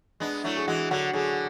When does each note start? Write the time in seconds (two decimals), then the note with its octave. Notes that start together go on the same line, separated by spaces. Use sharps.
0.20 G#3 B3 D4
0.44 F#3 A3 E4
0.57 G#4
0.68 E3 G#3 F#4
0.91 D3 F#3 F#4
1.13 D3 F#3 G#4